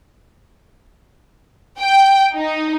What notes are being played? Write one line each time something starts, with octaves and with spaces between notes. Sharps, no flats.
G5
D#4